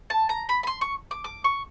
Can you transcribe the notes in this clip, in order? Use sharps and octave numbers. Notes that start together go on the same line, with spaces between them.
A5
A#5
B5
B5
C6
C#6
D6
D6
C#6